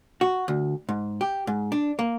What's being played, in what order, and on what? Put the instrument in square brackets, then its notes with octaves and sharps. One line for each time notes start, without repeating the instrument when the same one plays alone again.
[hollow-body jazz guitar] F#4
D2
G#2
G4
G#2
D4
A#3